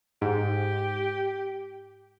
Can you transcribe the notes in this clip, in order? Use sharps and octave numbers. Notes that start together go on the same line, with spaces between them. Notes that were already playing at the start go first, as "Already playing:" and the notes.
G#2 G4